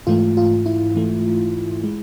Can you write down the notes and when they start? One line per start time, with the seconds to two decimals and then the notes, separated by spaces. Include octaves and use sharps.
0.07 G#2 E3 A3 F4
0.37 F4
0.66 E4
0.95 G#2 E3 A3
1.84 G#3